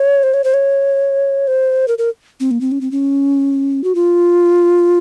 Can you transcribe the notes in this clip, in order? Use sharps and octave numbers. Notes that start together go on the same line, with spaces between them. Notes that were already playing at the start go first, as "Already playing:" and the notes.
Already playing: C#5
C5
C#5
C5
C#5
C5
A#4
A#4
C4
A#3
C4
C#4
C4
C#4
F#4
F4